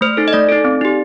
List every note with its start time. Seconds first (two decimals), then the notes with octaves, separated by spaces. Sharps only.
0.01 A3 C5
0.17 D#4 A4
0.28 D#5
0.33 A3 D5
0.49 D#4 A4
0.64 C4
0.81 D#4 G4